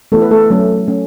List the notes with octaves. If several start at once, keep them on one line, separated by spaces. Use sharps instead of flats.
E3 A3 B3 A4
B4
A3 A4
F#3 A3 C#4
F#3 A3 C#4